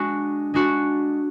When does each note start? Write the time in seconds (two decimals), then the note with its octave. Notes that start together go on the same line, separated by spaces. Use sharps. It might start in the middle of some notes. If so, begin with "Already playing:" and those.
Already playing: G#3 D4 F#4
0.54 G#3 D4 F#4